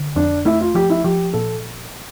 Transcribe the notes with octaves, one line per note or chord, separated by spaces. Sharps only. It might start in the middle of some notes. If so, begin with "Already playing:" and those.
Already playing: D3
F2 D4
A3 E4
F4
F3 G4
E4
F3 G4
A#2 A4